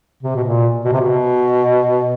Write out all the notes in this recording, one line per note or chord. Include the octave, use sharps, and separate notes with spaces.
C3
B2
A#2
B2
C3
B2